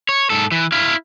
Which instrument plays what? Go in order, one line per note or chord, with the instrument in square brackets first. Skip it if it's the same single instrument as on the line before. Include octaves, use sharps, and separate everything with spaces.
[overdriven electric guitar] C#5
G#2 A4
E3
E4 F5